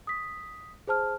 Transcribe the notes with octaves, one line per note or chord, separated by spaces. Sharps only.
D#6 B6
G#4 C5 A5 F6